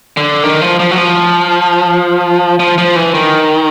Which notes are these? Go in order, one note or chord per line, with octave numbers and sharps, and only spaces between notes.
D3
D#3
F3
F3
F#3
F3
F3
F3
E3
D#3